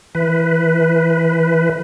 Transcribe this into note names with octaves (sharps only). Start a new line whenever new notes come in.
E3 B4